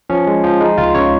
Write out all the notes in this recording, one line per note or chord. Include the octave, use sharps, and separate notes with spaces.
F3 C#4
G#3
F3
G#3 D#4
C#2 F4
C#3 C#5